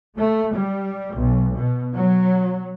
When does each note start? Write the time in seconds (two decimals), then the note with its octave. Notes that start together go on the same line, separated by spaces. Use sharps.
0.16 A3
0.53 G3
1.13 B1
1.55 B2
1.94 F#3